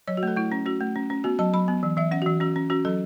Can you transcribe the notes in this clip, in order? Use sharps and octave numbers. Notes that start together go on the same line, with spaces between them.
F#3 C#5
F#4
A3
A4
A3 E4
C#4
C#4 F#4
A3
C#4
C#4
B3 F#4
F#3 A5
F#3 B5
B3
E3
E3 E5
C#4 F#5
F#4
E3
C#4 F#4
C#4
C#4 F#4
F#3 A4